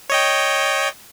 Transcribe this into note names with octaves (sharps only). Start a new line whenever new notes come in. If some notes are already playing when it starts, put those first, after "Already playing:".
C#5 D#5 G5